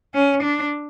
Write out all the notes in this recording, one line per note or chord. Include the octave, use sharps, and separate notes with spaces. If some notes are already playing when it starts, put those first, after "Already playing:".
C#4
D4